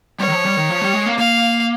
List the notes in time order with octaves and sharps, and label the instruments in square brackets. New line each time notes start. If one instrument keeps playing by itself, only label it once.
[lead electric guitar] G3 [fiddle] C#5
[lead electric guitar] D#3
F3
G3
D#3
F3
G3
G#3
A#3
[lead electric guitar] A#3 [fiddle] F5